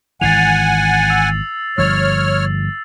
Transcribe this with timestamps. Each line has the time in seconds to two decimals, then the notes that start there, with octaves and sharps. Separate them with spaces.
0.21 G#1 E3 F#5 G#5 A6 C7 F7
1.08 E6 F7
1.78 G1 F3 C#5 E6 F6